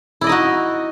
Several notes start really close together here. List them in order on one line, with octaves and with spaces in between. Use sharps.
E4 D5 D#5 D#4 F#4